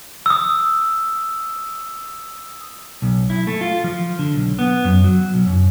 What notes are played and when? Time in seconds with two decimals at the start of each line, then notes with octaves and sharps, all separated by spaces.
0.26 D#6 E6
3.02 B1
3.30 E4
3.47 A3
3.61 F4
3.84 F3
4.19 D3
4.36 B1
4.59 B3
4.84 F#2
5.04 F#3
5.34 B1
5.47 F#2